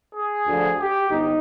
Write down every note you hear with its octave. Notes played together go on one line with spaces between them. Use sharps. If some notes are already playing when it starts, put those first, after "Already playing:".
G#4
D2 D3 F3
G4
G1 D#4